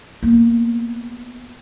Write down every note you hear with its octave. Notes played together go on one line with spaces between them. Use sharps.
A#3 B3